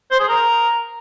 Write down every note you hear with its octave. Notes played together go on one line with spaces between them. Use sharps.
C5
G#4
A#4